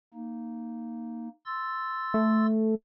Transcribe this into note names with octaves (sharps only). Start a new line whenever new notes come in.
A#3 D#4
C6 E6 A6
A3